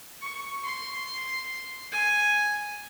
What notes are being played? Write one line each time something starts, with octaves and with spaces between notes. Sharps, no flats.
C#6
C6
G#5